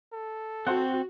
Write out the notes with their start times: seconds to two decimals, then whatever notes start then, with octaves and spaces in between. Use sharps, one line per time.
0.13 A4
0.67 C4 F#4 C5 F#5